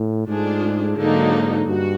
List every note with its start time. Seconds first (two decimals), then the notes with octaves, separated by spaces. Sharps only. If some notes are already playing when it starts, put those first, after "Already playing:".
Already playing: A2
0.28 G#2 A3 D4 F4 G#4
0.97 G#2 D3 F#3 A#3 D#4
1.67 G2 F#4